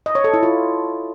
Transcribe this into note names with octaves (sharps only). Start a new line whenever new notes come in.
D#5
C#5
A4
E4
F4